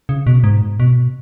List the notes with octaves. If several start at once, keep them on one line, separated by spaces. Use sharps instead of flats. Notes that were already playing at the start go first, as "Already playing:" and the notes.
C#3
B2
G#2
B2